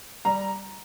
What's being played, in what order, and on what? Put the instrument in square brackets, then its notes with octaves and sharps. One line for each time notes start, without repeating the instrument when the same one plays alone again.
[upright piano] G3 A#5